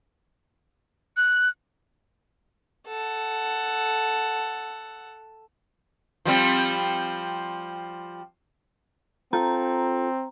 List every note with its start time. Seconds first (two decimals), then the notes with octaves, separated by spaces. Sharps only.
1.17 F#6
2.87 A4 F#5
6.25 F3 G3 C4
9.33 C4 F4 A4 A#5